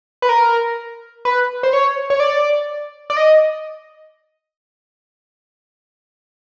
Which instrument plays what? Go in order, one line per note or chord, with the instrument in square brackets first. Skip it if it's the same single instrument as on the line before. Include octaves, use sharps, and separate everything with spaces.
[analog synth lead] B4
A#4
B4
C5
C#5
C#5
D5
D5
D#5